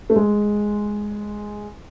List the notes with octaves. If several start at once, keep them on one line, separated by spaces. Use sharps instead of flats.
A3
G#3